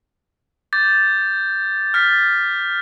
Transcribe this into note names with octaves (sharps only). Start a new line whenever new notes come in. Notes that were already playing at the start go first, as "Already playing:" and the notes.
D6 G6 A6
F6 A6 B6